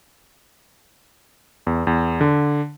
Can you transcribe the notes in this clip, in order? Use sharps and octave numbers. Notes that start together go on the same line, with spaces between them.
E2
E2
D3